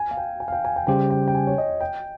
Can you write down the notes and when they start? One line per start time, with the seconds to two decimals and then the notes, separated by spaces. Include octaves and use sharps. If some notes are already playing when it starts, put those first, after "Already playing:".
Already playing: G#5
0.11 F5
0.17 G5
0.40 G#5
0.48 F5
0.52 G5
0.65 G#5
0.76 G5
0.87 C#3 G3 C#4 G4 C5 G5
1.10 G5
1.28 G5
1.35 G#5
1.47 C#5
1.58 D#5
1.81 G5